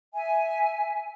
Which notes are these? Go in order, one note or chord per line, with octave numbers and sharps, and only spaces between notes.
E5 G#5